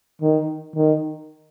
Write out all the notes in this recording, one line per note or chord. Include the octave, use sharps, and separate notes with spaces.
D#3
D#3